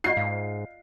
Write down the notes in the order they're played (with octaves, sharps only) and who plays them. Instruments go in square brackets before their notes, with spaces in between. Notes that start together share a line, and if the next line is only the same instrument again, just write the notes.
[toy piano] F4 D5 D#5 [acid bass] F#4 [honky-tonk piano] C7
[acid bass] G#2 [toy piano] F5